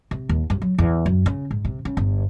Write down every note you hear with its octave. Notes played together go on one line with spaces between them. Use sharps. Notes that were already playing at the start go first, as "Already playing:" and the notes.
C3
D#2
G2
F#3
E2
F#2
C#3
G#2
C3
C#3
G1